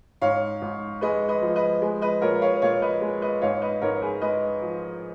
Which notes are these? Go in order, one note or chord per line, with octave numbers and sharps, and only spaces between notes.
G#2 C#5 F5
G#2
G#3 B4 D#5
B4 D#5
F3
B4 D#5
G#3
B4 D#5
A#2 A#4 C#5
C#5 F5
A#2 C#5 F5
B4 D#5
G#3
B4 D#5
G#2 C#5 F5
B4 D#5
G#2 A#4 C#5
G#4 B4
G#3 B4 D#5
F3